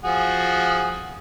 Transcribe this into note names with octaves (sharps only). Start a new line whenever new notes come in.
F3 F#4 G#4